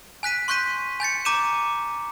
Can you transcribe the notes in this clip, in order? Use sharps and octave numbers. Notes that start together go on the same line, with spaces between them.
G#5 F#6 B6 D#7
C6 C#6 F#6 G6 B6 D#7
G#5 G6 A6 C#7
A#5 D6 G6 D#7 E7